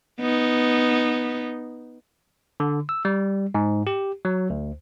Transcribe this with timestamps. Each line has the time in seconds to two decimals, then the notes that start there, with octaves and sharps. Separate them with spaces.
0.20 B3 D#4
2.60 D3
2.89 E6
3.05 G3
3.54 G#2
3.87 G4
4.25 F#3
4.50 D2